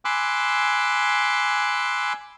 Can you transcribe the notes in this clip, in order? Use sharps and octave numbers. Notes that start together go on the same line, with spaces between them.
G#5 B5 C6 D6 E6 F#6